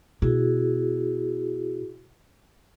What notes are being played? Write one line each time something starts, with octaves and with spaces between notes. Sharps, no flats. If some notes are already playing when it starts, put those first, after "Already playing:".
B2 E4 F#4 G#4